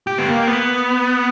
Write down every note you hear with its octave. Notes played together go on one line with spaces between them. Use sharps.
G4
B3
A#3
B3